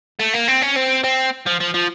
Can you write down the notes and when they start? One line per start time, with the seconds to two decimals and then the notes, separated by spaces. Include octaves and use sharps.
0.19 A3
0.34 A#3
0.48 C4
0.61 C#4
0.75 C4
1.04 C4
1.46 F3
1.60 F3
1.74 F3